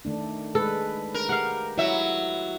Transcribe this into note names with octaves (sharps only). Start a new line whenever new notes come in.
D#3 A3 D4
G#3 A4 B4
A#4
G4 F5 F#5
F#3 E4 E5